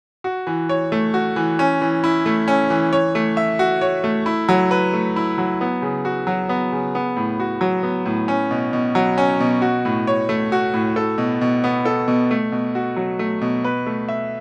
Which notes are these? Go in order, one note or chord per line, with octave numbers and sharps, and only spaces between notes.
F#4
E3
C#5
A3
F#4
E3
C#4
E3
E4
A3
C#4
E3
C#5
A3
E5
F#4
C#5
A3
E4
F#3
B4
A3
E4
F#3
B3
C#3
F#4
F#3
B3
C#3
B3
A2
F#4
F#3
B3
A2
C#4
B2
B2
F#3
C#4
B2
F#4
A2
C#5
A3
F#4
A2
A4
B2
B2
B3
A4
B2
A3
B2
F#4
F#3
A3
B2
B4
A3
E5